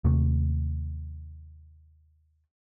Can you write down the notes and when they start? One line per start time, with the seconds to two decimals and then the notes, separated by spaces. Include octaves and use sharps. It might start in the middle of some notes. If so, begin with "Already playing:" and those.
0.04 D#2 C3 A3